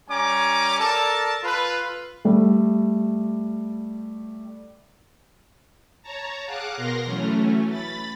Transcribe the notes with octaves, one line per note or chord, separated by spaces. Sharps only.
G3 C#4 G#5 A#5 D6
A4 A#4 D5 A5
F4 A4 B4
G3 A3
C#5 A5 A#5
G#4 F5 F#5 D6 F#6
B2 A#4 A#5 C6 A#6
E3 F#3 A3 C#4
B5 A6